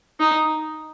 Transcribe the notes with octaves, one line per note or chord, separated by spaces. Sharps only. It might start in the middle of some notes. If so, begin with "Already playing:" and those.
D#4